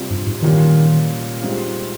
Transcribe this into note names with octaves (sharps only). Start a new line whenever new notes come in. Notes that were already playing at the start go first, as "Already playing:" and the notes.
Already playing: C3 G3 C4 F4
G2
G#2
A#2 D#3 G3 C#4 F4
G#2 G3 C4 F4